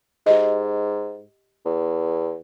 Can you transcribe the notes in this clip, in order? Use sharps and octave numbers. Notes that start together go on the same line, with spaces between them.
G#2 G4 D#5
E2